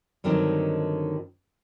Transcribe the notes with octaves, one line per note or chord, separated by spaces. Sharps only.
G2 D3 D#3 F#3 C4 D#4